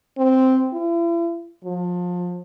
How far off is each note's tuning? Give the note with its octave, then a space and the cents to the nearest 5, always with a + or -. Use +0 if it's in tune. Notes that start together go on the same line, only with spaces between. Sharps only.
C4 -5
E4 +40
F3 +30